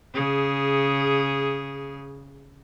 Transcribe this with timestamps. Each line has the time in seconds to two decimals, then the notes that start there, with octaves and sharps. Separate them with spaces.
0.14 C#3 G#4